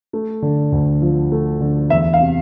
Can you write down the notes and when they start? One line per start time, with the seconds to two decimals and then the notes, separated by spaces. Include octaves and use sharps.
0.13 A3
0.42 D3
0.72 D2
1.02 F3
1.32 A3
1.61 D3
1.90 E2 E5
2.13 F5
2.20 C3